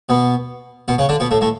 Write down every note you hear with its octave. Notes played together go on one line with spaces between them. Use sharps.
B2 B3
B2 B3
C#3 C#4
D3 D4
B2 B3
A2 A3
A2 A3